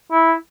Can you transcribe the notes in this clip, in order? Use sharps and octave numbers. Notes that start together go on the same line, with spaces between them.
E4